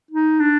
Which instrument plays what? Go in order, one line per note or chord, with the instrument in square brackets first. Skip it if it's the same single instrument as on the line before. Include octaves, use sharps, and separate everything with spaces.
[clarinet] D#4
D4